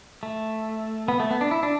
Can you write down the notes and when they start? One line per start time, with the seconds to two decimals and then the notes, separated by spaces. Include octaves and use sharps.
0.23 A3
1.08 B3
1.20 A3
1.31 B3
1.41 D4
1.51 E4
1.63 D4